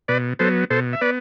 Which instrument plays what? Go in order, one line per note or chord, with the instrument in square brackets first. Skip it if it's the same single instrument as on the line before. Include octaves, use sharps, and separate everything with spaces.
[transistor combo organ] B2 B4 D5
F#3 B3 A4 C5
B2 A4 C5
E5
B3 B4 D5